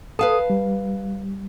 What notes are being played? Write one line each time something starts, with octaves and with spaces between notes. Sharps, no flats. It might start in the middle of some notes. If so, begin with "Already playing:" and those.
A4 B4 F5 A5 D#6
G3